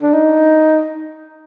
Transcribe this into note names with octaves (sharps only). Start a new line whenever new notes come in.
D4
D#4